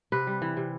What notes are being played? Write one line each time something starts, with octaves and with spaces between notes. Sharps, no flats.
C3 B4
G3
E3
C3